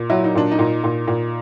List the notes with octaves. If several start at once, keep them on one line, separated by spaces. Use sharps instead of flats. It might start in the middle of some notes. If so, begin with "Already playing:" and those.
Already playing: A#2
F#3 E4
D#4
A#2 D4
D#4
A#2
A#2
A#2